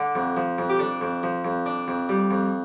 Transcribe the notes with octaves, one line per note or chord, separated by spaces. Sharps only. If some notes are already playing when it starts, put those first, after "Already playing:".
Already playing: D3
F2
F3
F2
G4
D4 A4
F2
F3
F2
D4
F2
G3
F2